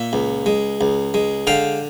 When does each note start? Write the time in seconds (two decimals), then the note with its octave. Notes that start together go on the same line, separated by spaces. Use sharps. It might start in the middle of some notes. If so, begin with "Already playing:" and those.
Already playing: A#2 E5
0.13 C#2
0.46 G#3
0.81 C#2
1.14 G#3
1.47 D3 F5 G5